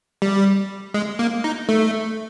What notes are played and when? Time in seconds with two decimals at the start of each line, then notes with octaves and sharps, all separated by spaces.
0.22 G3
0.94 G#3
1.19 A#3
1.44 D#4
1.69 A3